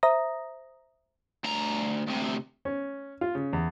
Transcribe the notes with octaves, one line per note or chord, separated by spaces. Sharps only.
C5 E5 A#5 D#6 A#6
D2 A#5
D2 C3
C#4
F4
C#3
E2